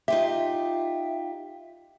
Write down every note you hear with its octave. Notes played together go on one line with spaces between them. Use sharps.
D#4 F4 G4 E5